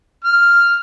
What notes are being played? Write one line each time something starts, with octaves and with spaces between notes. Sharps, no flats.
F6